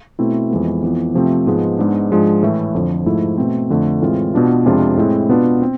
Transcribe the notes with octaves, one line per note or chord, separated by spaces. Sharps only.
B2 A3 C4 E4
F2 E3 G#3 B3
F2 E3 B3
C3 F3 A3 C4
G#2 F3 G#3 B3
G#2 G#3 B3 D4
G#2 F3 G#3 D4
A2 E3 A3 E4
F2 D3 F3
G#2 F3 A3 E4
B2 A3 C4
F2 D3 A3
A2 E3 G#3 C4 F4
B2 B3 D4 F4
F2 C3 G#3 D4 F4
A2 G#3 C4 E4
B2 B3 D4 F4
C4